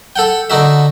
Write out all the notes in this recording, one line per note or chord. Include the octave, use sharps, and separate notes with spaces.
A4 F#5 G5
D3 D#4 F#4 E5